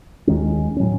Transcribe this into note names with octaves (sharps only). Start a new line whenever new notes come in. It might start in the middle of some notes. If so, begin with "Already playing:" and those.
D#2 D#3 G#3 C#4
A2 F#3 C#4